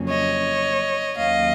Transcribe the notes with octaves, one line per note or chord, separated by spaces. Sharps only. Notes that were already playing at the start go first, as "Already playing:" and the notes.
Already playing: F2 C#3 F#3 A#3 C#4
C#5 D#5
D#2 D#3 F#3 A#3 C#4 D#5 F5